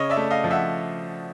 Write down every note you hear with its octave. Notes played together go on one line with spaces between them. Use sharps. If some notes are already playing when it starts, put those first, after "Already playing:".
Already playing: C#3 C#5 D#5
D5 E5
A3
D#5 F5
F3
E5 F#5